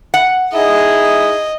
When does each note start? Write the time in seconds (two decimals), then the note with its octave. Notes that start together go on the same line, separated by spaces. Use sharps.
0.14 F#5
0.53 D#4 E4 G#4 D#5 E5